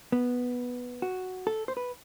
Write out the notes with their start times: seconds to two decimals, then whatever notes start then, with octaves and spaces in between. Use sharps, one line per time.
0.12 B3
1.02 F#4
1.47 A4
1.68 C5
1.77 B4